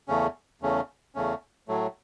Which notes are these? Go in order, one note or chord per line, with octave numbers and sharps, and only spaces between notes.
E2 C#3 A3 C#4
E2 C#3 A3 C#4
E2 C#3 A3 C#4
A2 F#3 A3